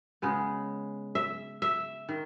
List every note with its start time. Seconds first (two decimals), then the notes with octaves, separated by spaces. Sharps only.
0.22 C#3 G#3 B3
1.15 E5
1.62 E5
2.09 D#3